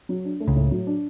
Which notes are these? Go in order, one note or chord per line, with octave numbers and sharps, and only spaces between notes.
F#3
D4
A3
C#2 C#3
A2
F#3
D4